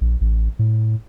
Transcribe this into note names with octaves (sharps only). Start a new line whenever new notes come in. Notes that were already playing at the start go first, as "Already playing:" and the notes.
A#1
A1
A2